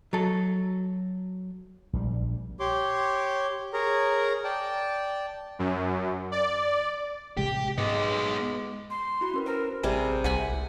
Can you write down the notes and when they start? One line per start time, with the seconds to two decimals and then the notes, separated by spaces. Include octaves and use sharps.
0.13 F#3 A4
1.93 A#1 D#3 G3
2.60 G4 C#5 C6 D6
3.73 G#4 A#4 C#5 A#5
4.44 D5 G5 A5
5.59 F#2
6.32 D5
7.37 A1 C3 G#3 G4
7.78 G#2 G#3 B3 D#4 D6
8.90 C6
9.21 E4 F#4 B5
9.34 C#4 A#4 B4
9.46 A#4 C5 A#5
9.83 A1 C3 G3 G#4
10.24 C2 F#5 G#5 B5